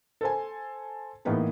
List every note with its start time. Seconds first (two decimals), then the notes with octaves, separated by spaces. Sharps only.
0.21 A4 C5 G#5
1.25 A2 E3 A#3 B3 D#4 G#4